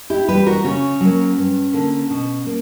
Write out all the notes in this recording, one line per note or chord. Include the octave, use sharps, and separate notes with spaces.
E4 G4
E3 G3 G4 B4
F#4 A#4
C#3 C#4
F#3 A#3
G2
D3 A#3
B2
A#3